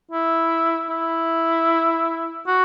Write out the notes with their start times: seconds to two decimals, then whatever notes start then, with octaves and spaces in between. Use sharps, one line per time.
0.11 E4
0.90 E4
2.47 F#4